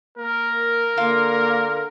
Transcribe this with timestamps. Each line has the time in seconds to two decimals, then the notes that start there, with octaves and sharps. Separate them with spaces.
0.18 A#3 A#4
0.97 D3 A#3 F4